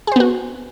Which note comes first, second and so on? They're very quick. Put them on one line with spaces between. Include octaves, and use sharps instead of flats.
G#4 C5 B3 F#4